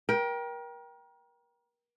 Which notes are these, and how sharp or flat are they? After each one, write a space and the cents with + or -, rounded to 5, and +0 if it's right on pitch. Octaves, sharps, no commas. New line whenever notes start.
A#4 +35 G5 +0